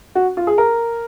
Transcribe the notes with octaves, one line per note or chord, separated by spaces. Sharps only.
F#4
F4
G#4
A#4